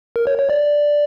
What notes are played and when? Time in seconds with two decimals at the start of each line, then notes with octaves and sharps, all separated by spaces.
0.16 A#4
0.27 C#5
0.39 C#5
0.50 D5